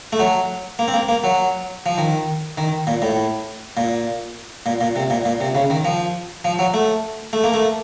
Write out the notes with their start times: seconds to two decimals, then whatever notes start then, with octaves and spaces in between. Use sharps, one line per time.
0.13 A3
0.19 F#3
0.79 A#3
0.88 C4
0.94 A#3
1.09 A#3
1.24 F#3
1.86 F3
1.98 D#3
2.58 D#3
2.87 A#2
3.02 A2
3.77 A#2
4.66 A#2
4.81 A#2
4.96 C3
5.10 A#2
5.25 A#2
5.40 C3
5.55 C#3
5.70 D#3
5.85 F3
6.45 F3
6.59 F#3
6.74 A3
7.33 A3
7.44 A#3
7.54 A3